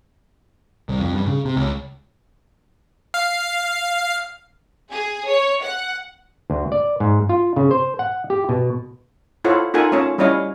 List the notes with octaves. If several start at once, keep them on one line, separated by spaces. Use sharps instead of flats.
C2
F2
G2
C#3
C3
C#2
F5
G#4
C#5
F#5
D2
D5
G#2
F4
C#3
C5
F#5
G4
B2
E4 F4 A4 C5 C#5 F#5
D#4 F4 A4 A#4 F#5 G#5
A3 C#4 F4 C#5 A5
G3 C#4 E4 C#5 D#5 F5